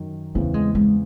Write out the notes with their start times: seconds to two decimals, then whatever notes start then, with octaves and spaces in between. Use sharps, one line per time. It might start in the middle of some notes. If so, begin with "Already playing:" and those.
Already playing: F#2 D#3
0.35 E2 C#3 E3 A3 C4
0.54 G#3
0.75 G#3